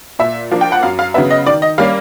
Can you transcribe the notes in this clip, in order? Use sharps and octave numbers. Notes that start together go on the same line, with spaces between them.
A#2 E5
F3 A#3 D4
G5
F#5
F#2 F5
F5
C#3 F#3 B3 E5
D#5
D#3 D5
D#5
G3 A#3 C#4 F5